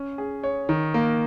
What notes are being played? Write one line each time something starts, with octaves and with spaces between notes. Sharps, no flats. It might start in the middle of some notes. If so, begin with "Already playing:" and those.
Already playing: C#4
G#4
C#5
D#3
A#3